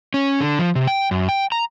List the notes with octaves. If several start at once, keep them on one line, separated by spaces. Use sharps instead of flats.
C#4
D3
F3
C3
G5
F#2
G5
A#5